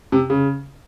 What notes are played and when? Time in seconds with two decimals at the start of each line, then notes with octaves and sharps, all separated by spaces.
0.12 C3
0.30 C#3